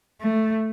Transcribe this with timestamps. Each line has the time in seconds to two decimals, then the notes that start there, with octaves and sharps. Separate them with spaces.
0.21 A3